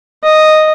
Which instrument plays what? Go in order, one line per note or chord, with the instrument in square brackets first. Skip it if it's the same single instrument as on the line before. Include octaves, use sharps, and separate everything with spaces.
[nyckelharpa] D#5